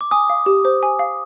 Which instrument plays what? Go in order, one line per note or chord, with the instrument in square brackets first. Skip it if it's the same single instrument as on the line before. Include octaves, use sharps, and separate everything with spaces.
[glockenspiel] D6
[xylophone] G#5 [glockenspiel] D#6
[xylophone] F5
G4
C5
G#5
F5